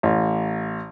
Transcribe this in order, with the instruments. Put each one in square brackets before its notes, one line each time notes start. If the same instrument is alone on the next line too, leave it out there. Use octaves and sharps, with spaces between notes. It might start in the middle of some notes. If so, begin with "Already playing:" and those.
[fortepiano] A1